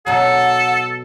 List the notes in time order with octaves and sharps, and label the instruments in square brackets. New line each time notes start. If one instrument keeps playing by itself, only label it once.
[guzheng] B2 F#3 [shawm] A4 [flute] F#5